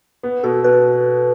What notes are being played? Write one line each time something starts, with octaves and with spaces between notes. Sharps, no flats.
B3
B2 A4
B2 B4